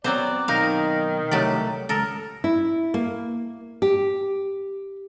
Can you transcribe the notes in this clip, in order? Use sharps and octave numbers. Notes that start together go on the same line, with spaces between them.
F#3 B3 C4 C5 D5
B1 D#3 D#4 A#4 F5
C2 F#3 A3 G4 D5
C#2 A4 A#4
E4
A#3
G4